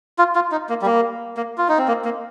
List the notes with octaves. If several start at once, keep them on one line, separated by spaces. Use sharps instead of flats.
F4
F4
D#4
A#3
G3
A#3
A#3
F4
D#4
C4
A#3
A#3